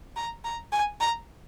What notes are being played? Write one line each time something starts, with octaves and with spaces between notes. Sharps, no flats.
A#5
A#5
G#5
A#5